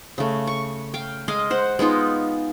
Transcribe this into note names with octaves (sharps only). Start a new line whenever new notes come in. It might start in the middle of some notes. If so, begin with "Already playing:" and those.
C#3 A3
C#6
F5 G5
G#3 D#5 F5
C5 F#5
G#3 B3 D#4 F4